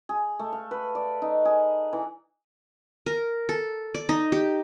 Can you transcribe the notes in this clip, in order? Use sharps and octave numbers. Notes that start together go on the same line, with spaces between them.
G#4
A3
F5
B4
D5
D#4
G#4
E3
A#4
A4
D5
D#4
G4